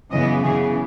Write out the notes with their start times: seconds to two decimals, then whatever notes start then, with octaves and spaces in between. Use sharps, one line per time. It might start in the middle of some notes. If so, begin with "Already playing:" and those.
0.12 F#2 C#3 E3 B3 D#5
0.44 C#3 E3 B3 G#4